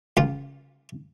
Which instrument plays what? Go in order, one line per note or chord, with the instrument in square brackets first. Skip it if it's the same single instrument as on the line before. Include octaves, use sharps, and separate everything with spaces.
[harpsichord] C#2 F4